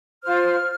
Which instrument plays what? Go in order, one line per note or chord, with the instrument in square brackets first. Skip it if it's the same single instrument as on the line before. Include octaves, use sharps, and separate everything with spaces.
[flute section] F4 C5 F6